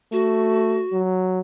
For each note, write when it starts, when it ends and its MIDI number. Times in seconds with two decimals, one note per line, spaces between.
0.12 0.83 57
0.12 0.99 66
0.93 1.40 54